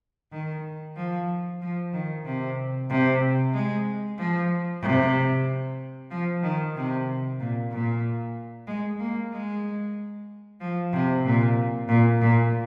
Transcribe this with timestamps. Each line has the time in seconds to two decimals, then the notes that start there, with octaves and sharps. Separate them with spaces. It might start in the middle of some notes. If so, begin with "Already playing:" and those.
0.32 D#3
0.96 F3
1.61 F3
1.93 D#3
2.25 C3
2.90 C3
3.53 G#3
4.18 F3
4.82 C3
6.11 F3
6.43 D#3
6.76 C3
7.40 A#2
7.71 A#2
8.67 G#3
8.99 A#3
9.32 G#3
10.61 F3
10.93 C3
11.25 A#2
11.88 A#2
12.21 A#2